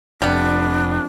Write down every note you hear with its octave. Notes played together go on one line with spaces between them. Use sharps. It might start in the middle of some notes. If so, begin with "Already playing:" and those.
F1 F2 G3 B3 D4